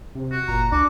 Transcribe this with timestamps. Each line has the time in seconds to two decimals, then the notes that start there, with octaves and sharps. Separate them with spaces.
0.15 C3
0.31 F#4
0.48 F#1 A#2 A#5
0.72 C#2 D4 F#4 D6